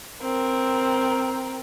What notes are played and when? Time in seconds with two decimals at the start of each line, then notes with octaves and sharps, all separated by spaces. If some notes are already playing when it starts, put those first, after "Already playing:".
0.22 C4 A#4